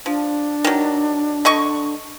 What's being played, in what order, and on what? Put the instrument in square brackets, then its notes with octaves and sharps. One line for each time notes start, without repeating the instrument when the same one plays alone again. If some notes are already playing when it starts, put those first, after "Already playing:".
[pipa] F3 [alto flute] D4
[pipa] D#3 F#3
D3 D#5 C#6